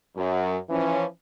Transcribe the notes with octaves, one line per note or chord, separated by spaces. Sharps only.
F#2
E3 F3 C#4